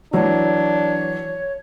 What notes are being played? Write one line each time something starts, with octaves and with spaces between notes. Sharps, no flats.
E3 F#3 D4 C#5